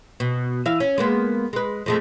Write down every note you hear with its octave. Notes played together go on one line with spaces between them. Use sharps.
B2
E3 E5 F5
C#4
G#3 A#3 B3
G#3 B4
F2 G#3 A3